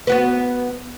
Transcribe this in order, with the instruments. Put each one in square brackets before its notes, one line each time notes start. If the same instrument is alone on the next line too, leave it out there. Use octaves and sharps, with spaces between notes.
[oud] B3 F#4 B4